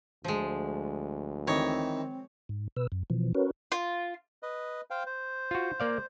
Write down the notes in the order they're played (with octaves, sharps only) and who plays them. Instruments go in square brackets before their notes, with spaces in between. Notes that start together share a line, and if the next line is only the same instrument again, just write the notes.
[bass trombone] D2 [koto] F3 G#3
[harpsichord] D#3 E3 D#4 [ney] C4 [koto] C#5
[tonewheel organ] G#2
B2 B4 E6
F#2
B2 E3 F3
C#4 F#4 A#4 B4 C#5
[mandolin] F4
[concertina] B4 D#5
C5 F5 G5
C5
[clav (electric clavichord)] F4 F#4
A#3 D5 F5